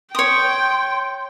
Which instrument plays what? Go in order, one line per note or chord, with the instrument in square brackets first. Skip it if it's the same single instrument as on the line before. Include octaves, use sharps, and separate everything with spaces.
[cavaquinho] C#5 D#6 [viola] G5 [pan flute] C6